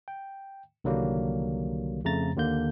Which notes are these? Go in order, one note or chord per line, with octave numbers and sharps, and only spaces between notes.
G5
C2 D3 D#3 F#3 G3 A#3
F2 C#3 A3 A#5 A6
D#2 D3 A#3 G6